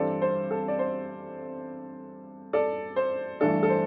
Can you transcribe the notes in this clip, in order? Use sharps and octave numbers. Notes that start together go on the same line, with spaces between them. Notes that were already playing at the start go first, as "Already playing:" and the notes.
Already playing: G2 E3 G3 C4 A4 D5
C5
A4
D5
C5
A4 D5
C5
G2 E3 A3 D4 A4
A4
C5